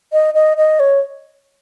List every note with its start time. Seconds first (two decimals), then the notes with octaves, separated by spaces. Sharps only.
0.13 D#5
0.34 D#5
0.57 D#5
0.80 C#5